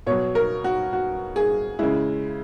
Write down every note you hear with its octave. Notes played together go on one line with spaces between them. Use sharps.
B2 F#3 C#5
A#4
F#4
F#4
G#4
C#3 G#3 E4